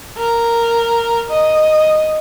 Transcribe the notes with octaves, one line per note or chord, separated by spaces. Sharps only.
A#4
D#5